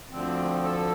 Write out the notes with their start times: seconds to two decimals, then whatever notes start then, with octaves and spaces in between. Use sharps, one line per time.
0.11 D2 D3 F3 C4
0.64 A4